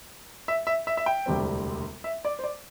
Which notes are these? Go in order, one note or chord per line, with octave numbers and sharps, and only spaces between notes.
E5
E5
E5
E5
G5
E1 D2 C3 G3 C4
E5
D5
C5
D5